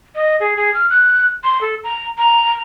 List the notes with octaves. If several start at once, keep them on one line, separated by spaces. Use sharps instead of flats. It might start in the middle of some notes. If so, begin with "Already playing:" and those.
D#5
G#4
G#4
F6
F#6
C6
A4
A#5
A#5